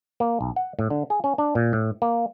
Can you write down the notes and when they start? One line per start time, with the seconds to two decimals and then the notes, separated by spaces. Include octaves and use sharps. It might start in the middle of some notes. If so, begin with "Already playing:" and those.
0.20 A#3
0.41 B1
0.56 F#5
0.79 A2
0.90 D3
1.10 G#4
1.24 C#4
1.38 D4
1.55 A#2
1.73 A2
2.02 A#3